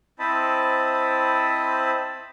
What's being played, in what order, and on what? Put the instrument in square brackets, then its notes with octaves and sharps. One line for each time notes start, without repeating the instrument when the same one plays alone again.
[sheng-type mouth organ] C4 E4 C5 D#5 A5 B5